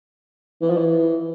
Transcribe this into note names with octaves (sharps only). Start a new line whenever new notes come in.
E3
F3
E3